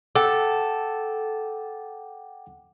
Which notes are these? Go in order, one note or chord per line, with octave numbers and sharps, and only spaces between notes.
A4 F#5 G5 D6